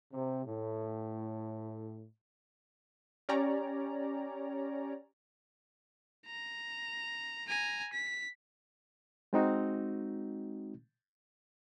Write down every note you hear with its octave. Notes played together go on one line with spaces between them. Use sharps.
C3
A2
C#4 G4 C#5 D5 A#5
A#5
G#5 A#5
B6
G#3 C4 D#4 F#4